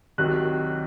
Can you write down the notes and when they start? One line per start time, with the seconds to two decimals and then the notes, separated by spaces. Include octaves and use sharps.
0.18 C2 C3 D#3 F#3 F#6